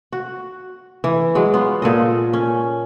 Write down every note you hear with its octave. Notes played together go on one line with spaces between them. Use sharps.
F#4
E3
F#3 G#3
B3 F4
A#2 A4 D#5
C#4